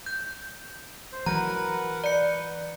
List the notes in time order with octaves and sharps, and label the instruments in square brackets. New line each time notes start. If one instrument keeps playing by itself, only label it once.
[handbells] G6
[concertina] C5
[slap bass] E3 F#3 [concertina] A#4 B4 F#5 [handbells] A#5
[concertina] B4 [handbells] D5 C#7